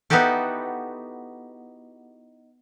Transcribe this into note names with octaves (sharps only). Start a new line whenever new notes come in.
B3 D#4 E4 F#4 G4 A4